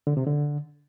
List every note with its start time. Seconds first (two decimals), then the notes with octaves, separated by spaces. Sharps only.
0.07 D3
0.17 C3
0.27 D3